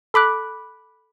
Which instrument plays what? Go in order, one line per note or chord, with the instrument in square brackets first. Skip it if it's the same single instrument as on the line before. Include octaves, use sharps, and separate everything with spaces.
[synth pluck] A4 B5 D6 F#6